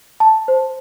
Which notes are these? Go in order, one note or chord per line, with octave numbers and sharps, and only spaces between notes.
A5
C5